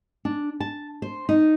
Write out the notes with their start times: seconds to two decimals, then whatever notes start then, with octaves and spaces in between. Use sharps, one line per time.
0.25 D4
0.60 A5
1.02 C5
1.29 D#4